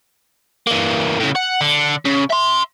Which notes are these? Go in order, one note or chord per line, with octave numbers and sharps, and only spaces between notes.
E3 A#3
A2 C#3
F#5
D3
C#3
E5 C6